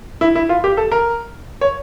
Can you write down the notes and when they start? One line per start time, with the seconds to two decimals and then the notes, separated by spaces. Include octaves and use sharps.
0.21 E4
0.35 E4
0.49 F4
0.64 G4
0.77 A4
0.92 A#4
1.61 C#5